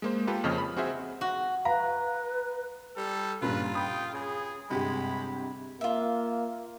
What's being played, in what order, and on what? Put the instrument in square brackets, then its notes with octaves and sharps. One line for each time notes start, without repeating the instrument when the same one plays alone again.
[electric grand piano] G#3 A#3 C5
A#3 F4 G4 A4 B4
F2 C#3 F3 C#5 D#5 F6
B5
C4 F#4 G#4 C5 E5
[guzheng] F#4
[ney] B4 [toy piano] F5 [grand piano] A#5
[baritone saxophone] G3 [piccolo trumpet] A4
[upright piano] G2 A#2 C#3 [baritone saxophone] F4 [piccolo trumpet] B4
[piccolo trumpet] G5 [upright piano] B5 D#6
[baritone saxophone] C#3 [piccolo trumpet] G#4
[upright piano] G1 C3 G4 [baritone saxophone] G#3 [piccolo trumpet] B5
[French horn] A#3 [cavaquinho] F4 E5